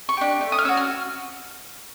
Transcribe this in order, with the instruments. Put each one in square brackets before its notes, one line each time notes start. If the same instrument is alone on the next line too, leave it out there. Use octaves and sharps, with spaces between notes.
[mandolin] C#6
D4 G4
A3
D#6
F6
C#4 F#4 E6
F6